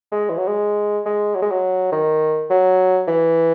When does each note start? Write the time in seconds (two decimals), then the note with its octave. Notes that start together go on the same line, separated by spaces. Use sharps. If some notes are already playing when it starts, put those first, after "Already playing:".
0.12 G#3
0.29 E3
0.38 F#3
0.48 G#3
1.06 G#3
1.35 F#3
1.42 G#3
1.51 F#3
1.92 D#3
2.50 F#3
3.08 E3